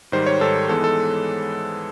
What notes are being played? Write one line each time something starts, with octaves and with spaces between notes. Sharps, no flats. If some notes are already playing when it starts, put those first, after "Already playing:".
G#2 D#3 G3 C5
C#5
G#2 D#3 G3 A4
G#2 E3 G#3 B3 A4
A4